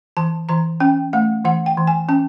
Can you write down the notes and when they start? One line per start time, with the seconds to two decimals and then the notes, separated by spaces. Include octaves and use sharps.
0.17 E3 A5
0.49 E3 A#5
0.80 C#4 G5
1.13 A3 F#5
1.45 E3 F#5
1.66 G5
1.77 E3
1.87 G#5
2.09 C#4 A5